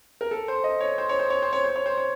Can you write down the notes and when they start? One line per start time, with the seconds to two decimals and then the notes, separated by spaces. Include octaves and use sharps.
0.21 A#4
0.31 A4
0.48 C5
0.64 D#5
0.80 C#5
0.98 C5
1.09 C#5
1.19 C5
1.30 C#5
1.43 C5
1.53 C#5
1.64 C5
1.76 C#5
1.86 C5
1.97 C#5